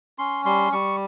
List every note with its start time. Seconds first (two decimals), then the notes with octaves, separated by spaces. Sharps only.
0.18 C#4 C6
0.45 G3 C6
0.72 G3 C#6